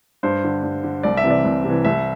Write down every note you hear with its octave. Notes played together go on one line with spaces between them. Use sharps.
G2 C5
D3
G2
D3
C2 D5
E5
C3 E3
D5
C2
C3
E3
C2 E5